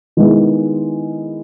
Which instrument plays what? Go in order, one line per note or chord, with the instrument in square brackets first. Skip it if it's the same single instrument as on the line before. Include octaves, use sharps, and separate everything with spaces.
[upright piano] D#3 G#3 B3 E4